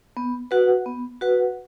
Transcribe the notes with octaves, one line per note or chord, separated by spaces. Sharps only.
B3
F#4 B4 F#5
B3
F#4 B4 F#5